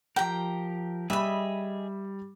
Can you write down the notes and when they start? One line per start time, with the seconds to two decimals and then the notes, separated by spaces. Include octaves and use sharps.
0.16 F3 G4 A#4 G5 A#5
1.10 G3 G#4 D#5 E5 G#5 B5